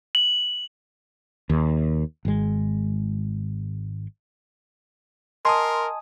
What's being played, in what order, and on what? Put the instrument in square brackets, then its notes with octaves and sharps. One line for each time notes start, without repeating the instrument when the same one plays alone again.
[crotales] F#7
[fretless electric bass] D#2
G#1 G#3
[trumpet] A#4 [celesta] D#5 A5 [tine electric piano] G#5 D#6 [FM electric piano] C6